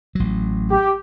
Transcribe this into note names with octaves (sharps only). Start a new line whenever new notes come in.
A1 F#3
G4